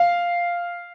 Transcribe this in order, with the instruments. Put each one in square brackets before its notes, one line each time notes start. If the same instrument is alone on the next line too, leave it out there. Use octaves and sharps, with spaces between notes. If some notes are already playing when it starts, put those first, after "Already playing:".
Already playing: [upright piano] F5